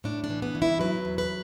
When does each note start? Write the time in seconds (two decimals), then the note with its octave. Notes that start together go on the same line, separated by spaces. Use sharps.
0.04 A2 D4
0.24 D4
0.30 E3
0.42 B3
0.55 E3
0.62 E4
0.80 F#3 B4
1.05 E2
1.18 B4